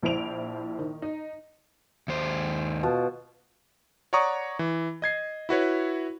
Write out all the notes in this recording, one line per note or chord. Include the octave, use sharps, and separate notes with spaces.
A#1 F3 E4 C5 D7 F7
D#3
D#4
D#2 C5
B2 F4 A5
C#5 D5 F#5 A#5 C#6 D#6
E3
D#5 G#6 C7
E4 F#4 B4 C#5